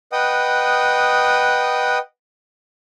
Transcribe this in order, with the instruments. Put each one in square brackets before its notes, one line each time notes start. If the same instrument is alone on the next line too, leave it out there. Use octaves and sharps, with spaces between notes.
[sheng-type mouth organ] B4 D#5 F#5 G5 D#6